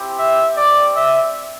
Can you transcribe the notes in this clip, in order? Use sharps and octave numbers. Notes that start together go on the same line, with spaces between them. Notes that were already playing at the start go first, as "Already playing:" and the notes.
Already playing: C4 E4 G4
E5
C4 G4 D5
E5